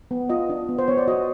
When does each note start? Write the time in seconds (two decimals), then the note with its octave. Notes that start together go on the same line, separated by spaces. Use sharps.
0.11 B3
0.29 F4 D#5
0.50 D4
0.69 B3
0.78 C5
0.88 B3 C#5
0.98 D5
1.08 F#4 D#5